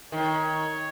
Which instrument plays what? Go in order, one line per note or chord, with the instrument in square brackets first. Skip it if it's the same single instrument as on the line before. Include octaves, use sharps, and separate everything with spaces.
[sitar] D#3 [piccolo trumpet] C#5